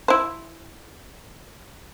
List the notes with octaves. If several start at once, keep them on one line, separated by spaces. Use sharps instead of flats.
E4 C5